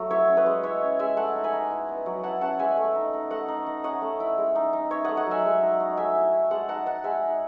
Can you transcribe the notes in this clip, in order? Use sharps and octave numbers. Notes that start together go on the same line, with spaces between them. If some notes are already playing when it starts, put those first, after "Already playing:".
Already playing: F#3 A3
E4 C#5 E5
C#4
B4 D#5
G#3
E4 C#5 E5
C#4
G#3 E5 G#5
A3 F#5 A5
D#4
G#5 B5
D#4
E4
B3
F#3
E4 F#5 A5
C#4 F#5 A5
G#3 E5 G#5
A3
D#4
D#4
A3 D#5 F#5
D#4
D#4
C#4 D#5 F#5
A3
E4
G#3
D#4
D#4
D#4 C#5 E5
A3 D#5 F#5
D#5 F#5
F#3 E5 G#5
G#3
D#4
D#4
A3 E5 G#5
E4
E4
G#3 F#5 A5
D#4 F#5 A5
D#4 F#5 A5
G#3 E5 G#5
D#4